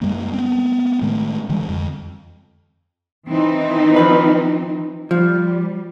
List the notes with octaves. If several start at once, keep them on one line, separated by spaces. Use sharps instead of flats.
F#2 G3 G#3 A#3
B3 C4
A2 D#3 G#3 A3
D3 E3 G3 G#3
F2
E3 C4 D#4
F3 B4
F3 G3